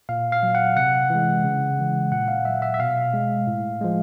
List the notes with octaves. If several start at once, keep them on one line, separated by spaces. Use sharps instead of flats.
A#2 F5
F5
F#3
F#5
C3 F#5
E3 G#3
C#3
E3 G#3
A#2 F#5
F5
F#3 E5
E5
E5
B2 F5
G#3
A2
F3 G#3